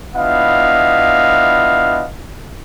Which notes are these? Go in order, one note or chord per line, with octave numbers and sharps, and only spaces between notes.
B3 D4 E4 F4 D#5 F5